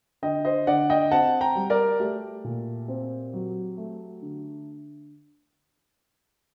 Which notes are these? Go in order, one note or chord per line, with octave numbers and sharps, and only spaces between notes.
D3 D#5 G5
C5 D#5
D3 D5 F#5
D#5 G5
C4 F#5 A5
G5 A#5
G3
A#4 D5
A3 G4
A#2
C4
F#3
A3
D3